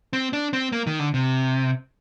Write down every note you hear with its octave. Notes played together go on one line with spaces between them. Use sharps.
C4
D4
C4
A#3
D#3
D3
C3